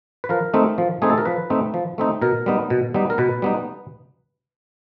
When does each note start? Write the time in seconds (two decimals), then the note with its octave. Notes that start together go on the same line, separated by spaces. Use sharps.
0.24 B4
0.29 F3 A#4
0.54 A3 C4 D#4
0.78 F3
1.02 A3 C4 D#4 G#4
1.10 A4
1.18 A#4
1.25 F3 B4
1.50 A3 C4 D#4
1.74 F3
1.98 A3 C4 D#4
2.22 B2 A#4
2.46 G3 B3 D#4
2.70 B2
2.94 G3 B3 D#4
3.10 A#4
3.18 B2 B4
3.42 G3 B3 D#4